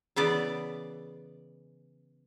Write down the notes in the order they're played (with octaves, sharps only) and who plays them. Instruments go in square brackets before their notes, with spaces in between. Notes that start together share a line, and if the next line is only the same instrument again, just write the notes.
[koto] C#3 E3 B3 D5